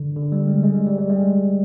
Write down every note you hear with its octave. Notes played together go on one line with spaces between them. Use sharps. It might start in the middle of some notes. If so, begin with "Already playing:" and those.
Already playing: D3
D3
G3
G#3
G#3
G3
G3
G3
G#3